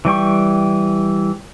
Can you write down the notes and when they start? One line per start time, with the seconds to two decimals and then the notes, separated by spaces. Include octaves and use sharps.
0.05 E3 G3 G5 C#6